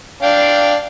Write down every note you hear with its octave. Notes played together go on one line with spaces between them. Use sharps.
D4 F5 G5